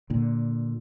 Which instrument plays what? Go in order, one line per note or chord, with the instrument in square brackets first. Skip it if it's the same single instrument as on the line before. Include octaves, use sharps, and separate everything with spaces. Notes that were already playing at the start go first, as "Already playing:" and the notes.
[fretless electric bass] A#2 D3